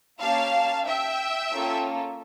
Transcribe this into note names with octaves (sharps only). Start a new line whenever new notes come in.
A#3 C#4 G4 F5 A5
E5 G5
A#3 C#4 F4 A4